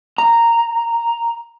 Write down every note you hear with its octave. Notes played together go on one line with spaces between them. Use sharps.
A#5